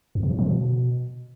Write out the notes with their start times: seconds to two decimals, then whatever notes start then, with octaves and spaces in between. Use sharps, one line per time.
0.15 F2
0.23 C3
0.31 A2
0.39 F3
0.46 B2